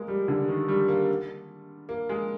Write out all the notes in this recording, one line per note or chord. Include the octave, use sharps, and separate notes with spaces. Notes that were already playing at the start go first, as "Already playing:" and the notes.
Already playing: G#3 A#3
G3
D3
D#3
G3
A#3
A#3
G#3